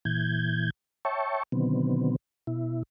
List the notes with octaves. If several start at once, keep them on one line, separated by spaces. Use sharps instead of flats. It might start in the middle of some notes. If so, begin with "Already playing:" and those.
A#2 E3 G6 G#6
C#5 E5 G5 A5 C#6
B2 D3 D#3 F#3 B3 C4
B2 E4